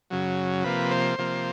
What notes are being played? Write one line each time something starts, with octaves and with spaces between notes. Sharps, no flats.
F#2 C#3 F#3
C3 F3 A#3 B4
C5
C3 F3 A#3